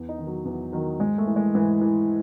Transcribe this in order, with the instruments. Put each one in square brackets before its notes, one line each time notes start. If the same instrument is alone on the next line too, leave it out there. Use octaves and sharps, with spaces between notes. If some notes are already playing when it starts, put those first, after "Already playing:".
Already playing: [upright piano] E2
D#4
D#3
F#3
E2
D#3 F#3
G#2 G#3
A3
E3
G#3
G#2 E3
E3